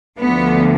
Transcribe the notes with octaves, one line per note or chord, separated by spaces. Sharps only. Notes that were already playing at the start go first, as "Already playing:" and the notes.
D2 D3 F3 B3